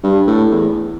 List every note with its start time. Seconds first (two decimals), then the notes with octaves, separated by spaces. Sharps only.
0.03 G2
0.27 A2
0.51 E2